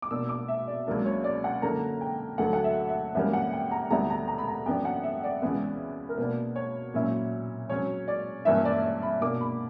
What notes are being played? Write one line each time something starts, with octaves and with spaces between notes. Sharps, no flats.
D6
B2 A#3 D4 E6
D6
E5
D5
C#2 C#3 F#3 A#3 D4
C#5
D5
F#5
F#2 D3 A#3 A#5
G5
D2 D3 F#3 F#5
F#5
E5
E5
F#2 E3 G3 A#3
F#5
G5
A#5
D2 D3 G3 B3 E4 A#5
A#5
A#5
B5
A#5
F#2 E3 B3 D4 G5
F#5
E5
D5
C#2 C#3 E3 B3
A#4
B2 A#3 D4 B4
C#5
A#2 F#3 C#4 E4
C#3 F#3 C#4 C#5
D5
G2 E3 A#3 C#4 E4 E5
D5
D5
B5
B2 A#3 D4 D6
B5